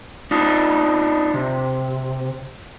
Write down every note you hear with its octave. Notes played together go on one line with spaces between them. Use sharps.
D4 D#4 F4
C3